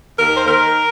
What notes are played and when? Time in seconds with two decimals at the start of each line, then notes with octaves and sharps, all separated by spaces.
0.19 D#2 A#4
0.36 C5
0.47 D#3 A#4